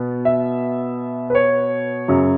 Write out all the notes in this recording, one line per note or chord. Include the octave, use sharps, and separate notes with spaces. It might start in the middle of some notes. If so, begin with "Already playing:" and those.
Already playing: B2 B3
E5
B4
C#5
F#2 C#3 F#3